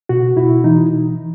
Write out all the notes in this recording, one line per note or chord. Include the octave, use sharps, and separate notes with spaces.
B2 F#4
B2 E4
E3 D#4